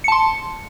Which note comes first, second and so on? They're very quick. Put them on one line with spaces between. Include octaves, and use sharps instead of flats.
C#7 A5 C6